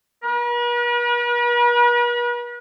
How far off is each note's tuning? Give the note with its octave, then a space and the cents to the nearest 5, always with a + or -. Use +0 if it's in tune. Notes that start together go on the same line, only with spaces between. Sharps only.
B4 -45